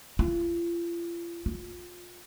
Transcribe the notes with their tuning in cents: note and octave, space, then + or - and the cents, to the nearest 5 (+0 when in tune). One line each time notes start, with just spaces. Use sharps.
F4 -40
F4 +25